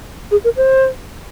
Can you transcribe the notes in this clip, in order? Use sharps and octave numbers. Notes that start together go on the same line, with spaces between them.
G#4
A#4
C5